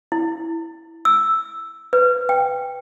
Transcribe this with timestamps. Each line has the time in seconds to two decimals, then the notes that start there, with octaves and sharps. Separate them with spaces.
0.12 E4
1.05 E6
1.93 B4
2.29 G5